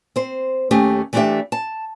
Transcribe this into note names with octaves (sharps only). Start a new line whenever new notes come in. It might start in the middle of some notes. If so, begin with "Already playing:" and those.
C4 C5
D#2 A3 C#4 G4 D#5
E3 A3 C4 D4 G4 E5
A5